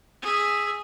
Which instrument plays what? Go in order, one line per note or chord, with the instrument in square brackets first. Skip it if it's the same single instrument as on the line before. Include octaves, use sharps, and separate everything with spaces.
[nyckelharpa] G#4 E5